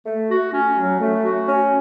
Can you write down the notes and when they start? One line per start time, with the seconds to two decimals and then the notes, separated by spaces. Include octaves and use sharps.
0.06 A3
0.29 F#4
0.53 C#4
0.76 F#3
1.01 A3
1.24 F#4
1.48 C#4